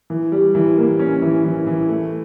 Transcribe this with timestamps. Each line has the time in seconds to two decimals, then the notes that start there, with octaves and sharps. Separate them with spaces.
0.10 E3
0.32 G3
0.55 E3
0.78 A#3
0.99 C#4
1.22 E3
1.45 E3
1.67 E3
1.89 A3